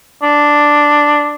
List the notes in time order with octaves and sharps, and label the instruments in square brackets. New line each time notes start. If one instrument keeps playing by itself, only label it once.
[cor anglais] D4